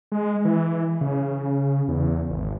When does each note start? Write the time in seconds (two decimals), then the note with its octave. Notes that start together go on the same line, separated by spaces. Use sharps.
0.12 G#3
0.45 E3
1.01 C#3
1.88 E2
2.30 G#1